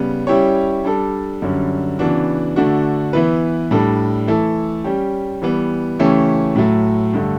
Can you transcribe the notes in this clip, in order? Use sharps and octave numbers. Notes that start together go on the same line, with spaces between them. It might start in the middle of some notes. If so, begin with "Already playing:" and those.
Already playing: C#3 G3 B3
G3 C#4 E4 G4 C#5
G3 D4 A4
F#2 D3 G3 C#4
C#3 E3 B3 D4 F#4
D3 A3 D4 F#4
E3 B3 E4 B4
A2 G3 D4 A4
E3 A3 E4 A4
G3 C#4 G4
E3 G3 B3
C#3 E3 A3 C#4 G4
A2 F#3 A3
G2 D3 A3